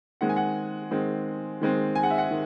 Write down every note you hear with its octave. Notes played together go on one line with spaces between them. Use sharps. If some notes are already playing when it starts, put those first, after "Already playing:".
D#3 G#3 C4 F#5
G#5
F#5
D#3 G#3 C4
D#3 G#3 C4
G#5
F#5
E5
F#5
D#3